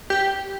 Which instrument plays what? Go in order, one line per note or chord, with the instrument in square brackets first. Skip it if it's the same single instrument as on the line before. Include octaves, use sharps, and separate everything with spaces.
[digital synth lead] G4